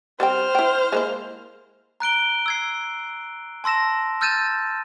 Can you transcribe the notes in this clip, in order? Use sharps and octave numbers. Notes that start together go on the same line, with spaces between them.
G3 C4 C5 G5 F6
E4 G5
G#3 A#3 E4
A#5 F#6 D7 G7
E6 G#6 C7
A5 C6 E6 A#6 E7
E6 F6 G6 A6 D#7 E7